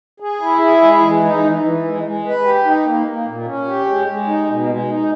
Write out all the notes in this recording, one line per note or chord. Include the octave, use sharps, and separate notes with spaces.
G#4
E4
G#4
G#3
E3
D#4
E3
E3
G#3
G#3
B4
G4
D#4
A#3
A#3
A#2
C#4
G4
G#3
G#3
D#4
B2
G#3
D#4